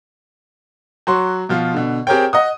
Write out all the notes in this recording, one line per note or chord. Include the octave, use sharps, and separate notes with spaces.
F#3 F#4 C6
B2 F3 F4
B2 D3
C4 G4 G#4 A#4 C#5 G5
D#5 F#5 D#6